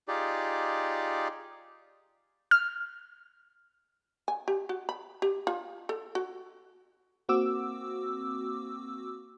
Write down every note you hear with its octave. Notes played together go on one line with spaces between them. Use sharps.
D#4 F4 G4 G#4 D5
F6
G#5
G4
F#4
B5
G4
F4
A4
F#4
A#3 C4 F#4 D6 E6